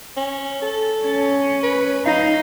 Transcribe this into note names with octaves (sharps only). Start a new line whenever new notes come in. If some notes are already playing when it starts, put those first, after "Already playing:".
C#4
A4
C#4
B4
D#4 F5